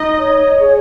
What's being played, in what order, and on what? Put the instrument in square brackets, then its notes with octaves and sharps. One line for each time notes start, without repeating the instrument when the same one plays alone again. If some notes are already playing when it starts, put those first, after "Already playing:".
Already playing: [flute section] D#4 [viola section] D#5
[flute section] C#5
G#4